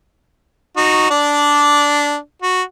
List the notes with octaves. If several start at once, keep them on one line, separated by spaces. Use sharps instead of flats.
D#4 F#4
D4 D5
F#4